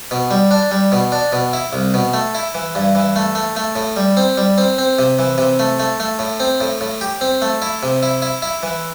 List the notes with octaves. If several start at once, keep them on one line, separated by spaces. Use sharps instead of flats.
B2
G3
D4
G3
B2
D4
B2
E4
C2
B2
A3
E4
E3
G2
E3
A3
A3
A3
A2
G3
C4
G3
C4
C4
C3
E3
C3
A3
A3
A3
A2
C4
A2
A2
G4
C4
A3
E4
C3
E4
E4
E4
E3